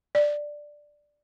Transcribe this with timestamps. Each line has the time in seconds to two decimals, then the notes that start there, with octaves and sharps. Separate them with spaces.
0.15 D5